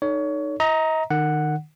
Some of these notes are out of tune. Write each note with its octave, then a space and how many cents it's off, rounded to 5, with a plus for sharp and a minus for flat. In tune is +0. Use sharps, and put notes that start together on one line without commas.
D#4 -20 A4 +0 C#5 +25
D#5 +35 A#5 +0
D#3 -25 F#5 +0